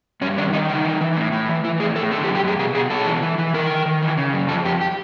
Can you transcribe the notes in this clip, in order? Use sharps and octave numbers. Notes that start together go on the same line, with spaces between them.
G2 C#4
D#3 D4
D#3 D#4
C#3 D#4
E3
E3
A2
A2
E3
E3 E4
A2 G#4
A2 A4
D3 A4
G4
F#2
G4
F#2 G#4
B2 G#4
B2 G#4
B2 A4
E3
E3
E3
D#3 A#4
D#3
D#3
E3
C#3
F#2
F2 A4
F2 G4
G4